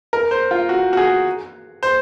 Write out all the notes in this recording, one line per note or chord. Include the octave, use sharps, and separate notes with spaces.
A#4
C5
F4
F#4
F#4
G#4
C5